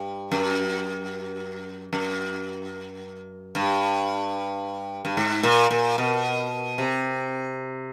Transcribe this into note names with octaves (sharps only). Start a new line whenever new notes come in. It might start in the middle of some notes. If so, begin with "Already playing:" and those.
Already playing: G2
F#2
F#2
G2
G2
G#2
A#2
A#2
B2
C3